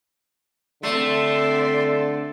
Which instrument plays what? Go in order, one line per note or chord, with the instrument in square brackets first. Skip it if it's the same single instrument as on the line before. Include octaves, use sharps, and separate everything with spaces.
[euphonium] D3 [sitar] A3 [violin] C4 D5 [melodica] E5 C6